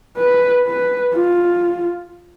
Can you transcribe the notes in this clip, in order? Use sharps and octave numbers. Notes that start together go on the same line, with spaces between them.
B4
B4
F4